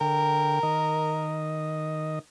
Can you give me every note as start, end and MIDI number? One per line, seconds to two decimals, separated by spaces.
0.01 0.59 50
0.01 1.41 70
0.01 0.59 79
0.63 2.19 51
0.63 2.19 75